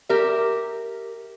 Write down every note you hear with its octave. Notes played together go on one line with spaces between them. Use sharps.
G4 A#4 E5